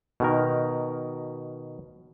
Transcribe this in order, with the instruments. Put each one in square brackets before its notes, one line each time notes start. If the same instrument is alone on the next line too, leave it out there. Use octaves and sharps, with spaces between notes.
[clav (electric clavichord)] B2 D#3 A#4